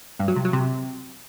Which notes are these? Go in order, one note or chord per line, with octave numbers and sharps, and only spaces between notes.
G2
F#3
C3
F#3
C3